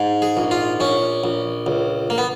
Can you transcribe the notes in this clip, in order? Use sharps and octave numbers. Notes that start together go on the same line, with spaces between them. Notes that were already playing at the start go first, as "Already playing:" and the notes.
Already playing: G#2
G#4
A#1
F4
A#1 C#4
A#1
C#2
A#3
B3